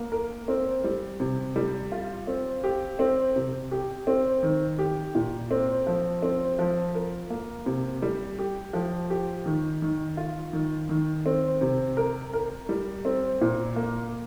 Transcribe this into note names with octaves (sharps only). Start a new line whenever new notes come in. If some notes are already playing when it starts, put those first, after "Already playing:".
Already playing: A#3
A#4
C4
G3
C3
G3
F4
C4
G4
C4
C3
G4
C4
D#3
G4
A#2
C4
F3
C4
F3
A#4
A#3
C3
G3
G4
F3
G4
D#3
D#3
F4
D#3
D#3
C4
C3
A#4
A#4
G3
C4
A#2
A#3